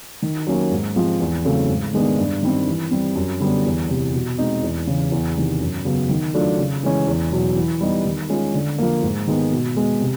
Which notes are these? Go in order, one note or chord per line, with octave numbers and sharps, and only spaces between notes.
D#3
F#3 A#3 C#4
G#2
F3 G#3 C4
E2
C#3 F#3 A3 C4
G#2
D#3 G#3 B3 D4
G2
D#3 G3 C4
E3
G3 C4
F#2
D3 G3 B3
E2
C3 E3
B2
G#3 C4 D#4
E2
C#3 E3
E2
C3 D#3
F#2
C#3 F#3 B3
D#3
F#3 A3 D4 F4
C#3
E3 G#3 C#4
E2
B2 F#3
E3
G3 B3 D#4
D#3
G#3 C#4 F4
D3
F3 A#3
G#2
D#3 G#3 B3
B2
G#3 B3
C3